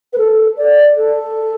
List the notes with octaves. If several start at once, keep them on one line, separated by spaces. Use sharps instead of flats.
B4
A4
D5
A4